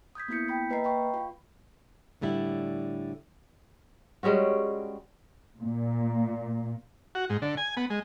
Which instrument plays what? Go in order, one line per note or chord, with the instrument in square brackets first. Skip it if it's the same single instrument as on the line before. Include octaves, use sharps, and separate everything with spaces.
[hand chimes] D#6 G6 G#6 B6
A#3 B3 E4 G6 B6 C#7
G5 B5 B6
A#3 B4 D#5 A#5 C7
G5 B5 C#6
F4
[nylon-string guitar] A2 D3 G3 E4
[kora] G3 G#3 C#4 F#4
[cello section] A#2
[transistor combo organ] F#4
G#2
D3
G#5
B3
G#3